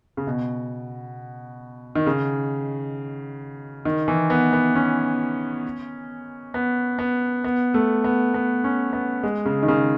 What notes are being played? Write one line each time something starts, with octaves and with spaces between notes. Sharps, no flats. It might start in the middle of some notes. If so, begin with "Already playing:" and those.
C#3
B2
D#3
C#3
D#3
E3
B3
B3
C#4
B3
B3
B3
A3
B3
B3
C#4
B3
G#3
C#3
D#3
C#3